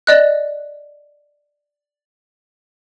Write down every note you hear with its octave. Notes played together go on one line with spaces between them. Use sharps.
D5 D#5 F#6